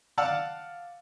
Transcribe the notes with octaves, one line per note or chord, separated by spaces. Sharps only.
D5 F5 F#5 A5 E6 F6